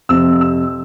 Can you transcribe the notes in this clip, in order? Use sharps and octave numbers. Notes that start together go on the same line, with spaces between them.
F2 C3 F3 E6
E6